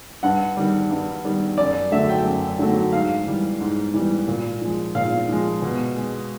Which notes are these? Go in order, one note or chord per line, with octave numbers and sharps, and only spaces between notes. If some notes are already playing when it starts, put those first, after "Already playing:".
G2 F#5
D#3 G3
G2
D#3 G3
F#2 D5
D3 F#3 A3 E5
G5
F#2
D3 F#3 A3
G#2 F5
E3 G3
G#2
E3 G3
A#2
F3 G#3
A#2 F5
F3 G#3
B2
G#3